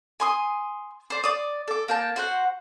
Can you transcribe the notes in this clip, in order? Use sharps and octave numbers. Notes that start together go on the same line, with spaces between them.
G#5 C6 D#6
C5 D5
D5 D#6
A4 D6
A#3 G5 A5
F#4 C5 F#5